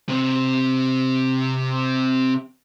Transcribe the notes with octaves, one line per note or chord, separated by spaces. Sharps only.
C3 C4